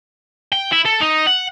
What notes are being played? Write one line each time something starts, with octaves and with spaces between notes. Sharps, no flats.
G5
E4
A4
D#4
F#5